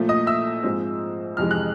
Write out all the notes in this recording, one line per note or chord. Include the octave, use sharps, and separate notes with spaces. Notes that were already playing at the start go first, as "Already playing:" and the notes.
Already playing: A#2 F3 A3
D#5 D#6
E5 E6
G#2 F3 G#3 C4
F2 C3 E3 G#3 F6
F#6